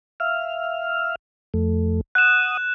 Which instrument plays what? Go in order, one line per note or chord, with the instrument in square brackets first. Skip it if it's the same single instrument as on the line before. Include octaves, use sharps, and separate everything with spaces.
[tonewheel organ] E5 F5 F6
F2 A3
[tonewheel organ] F#5 D#6 [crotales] F#6 E7